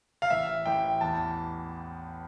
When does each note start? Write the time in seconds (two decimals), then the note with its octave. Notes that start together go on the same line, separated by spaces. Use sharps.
0.22 F5
0.30 A1 E5
0.66 A1 G5
1.01 E2 A5